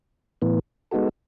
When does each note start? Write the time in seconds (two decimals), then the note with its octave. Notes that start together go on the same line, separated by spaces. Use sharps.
0.42 A2 E3 B3
0.91 G#3 B3 D#4 F#4 A4